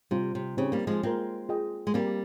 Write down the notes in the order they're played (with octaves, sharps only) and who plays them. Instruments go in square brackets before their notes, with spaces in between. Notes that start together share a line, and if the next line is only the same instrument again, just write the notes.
[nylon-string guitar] C3 [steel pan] G3 C4 F4
[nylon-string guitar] C3
[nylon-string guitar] C#3 [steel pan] C4 D#4 G4 C5
[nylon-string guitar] G3 A#3
F3 G#3
[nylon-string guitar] G#3 C4 [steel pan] A#3 F4 A#4
[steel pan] F4 G#4 D#5 G5
[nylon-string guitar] G#3
[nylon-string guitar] G3 A#3 [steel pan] C4 G4 A#4